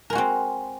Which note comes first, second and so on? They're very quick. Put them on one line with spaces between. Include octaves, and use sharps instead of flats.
A#4 G#3 F#4 C4